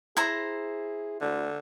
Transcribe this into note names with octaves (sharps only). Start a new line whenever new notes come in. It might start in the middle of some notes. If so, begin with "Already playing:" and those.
E4 G#4 C5 A#5
D2 D3